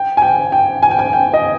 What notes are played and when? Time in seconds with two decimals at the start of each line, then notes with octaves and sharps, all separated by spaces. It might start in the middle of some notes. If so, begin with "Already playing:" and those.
Already playing: G5
0.17 G#5
0.22 G5
0.52 G5
0.83 G#5
0.91 G5
0.99 G#5
1.13 G5
1.34 D#5